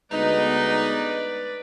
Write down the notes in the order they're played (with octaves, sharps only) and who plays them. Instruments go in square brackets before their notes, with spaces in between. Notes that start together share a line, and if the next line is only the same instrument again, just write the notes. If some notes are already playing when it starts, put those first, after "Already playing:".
[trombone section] D2 G#3 B3 [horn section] D#4 [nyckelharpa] B4 D5